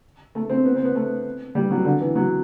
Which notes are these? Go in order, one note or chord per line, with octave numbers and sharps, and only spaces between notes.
A3
C4
B3
C4
B3
A3
G3
F#3
D3
E3
F#3